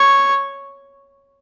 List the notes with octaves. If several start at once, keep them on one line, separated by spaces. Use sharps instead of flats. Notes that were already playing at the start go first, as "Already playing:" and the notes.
Already playing: C#5